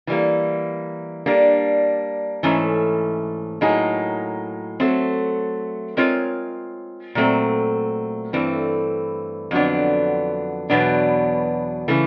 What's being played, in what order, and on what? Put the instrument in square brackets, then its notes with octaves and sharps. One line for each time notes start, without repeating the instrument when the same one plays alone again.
[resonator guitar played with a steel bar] E3 G3 A#3
G3 A#3 D4
G#2 E3 A3 C#4
A2 F#3 A#3 D#4 G#4
F#3 A3 C4
G#3 C4 F4 A#4 C#5
A#2 F#3 A3 C4
G2 E3 A3 C4
F2 D3 F#3 B3 D4
E2 B2 F#3 B3 D4
C#3 E3 A3